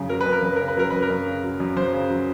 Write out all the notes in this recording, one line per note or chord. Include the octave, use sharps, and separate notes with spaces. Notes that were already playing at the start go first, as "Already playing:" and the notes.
Already playing: F#2 C#3
F#3 A#4
B4
F#2
A#4
F#2 B4
C#3 A#4
B4
F#3 A#4
F#2 B4
A#4
F#2
C#3
F#3
F#2
F#2 C5
C#3
F#3